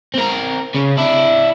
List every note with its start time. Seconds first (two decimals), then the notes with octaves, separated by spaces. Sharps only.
0.14 C4 A#4
0.74 C#3
0.97 D4 E4